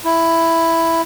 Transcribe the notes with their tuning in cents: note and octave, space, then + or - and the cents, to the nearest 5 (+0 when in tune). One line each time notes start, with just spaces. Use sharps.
E4 +5